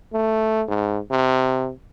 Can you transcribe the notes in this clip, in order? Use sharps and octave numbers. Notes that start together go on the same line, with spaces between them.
A3
G#2
C3